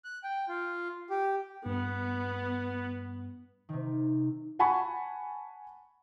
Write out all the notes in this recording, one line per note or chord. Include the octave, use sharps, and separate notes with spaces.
F#6
G5
F4
G4
G2 B3
C3 D#3
F#5 G#5 A5 B5 C#6